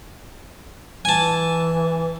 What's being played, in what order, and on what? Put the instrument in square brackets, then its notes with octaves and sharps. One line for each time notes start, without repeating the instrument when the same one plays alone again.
[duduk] E3 [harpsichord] G#5 A5